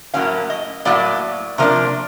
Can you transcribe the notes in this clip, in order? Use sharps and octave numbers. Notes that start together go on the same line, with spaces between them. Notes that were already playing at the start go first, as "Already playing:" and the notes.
A2 F#3 A#3 C#4 F5
D#5
A2 F#3 A#3 D5
C3 F3 A#3 D4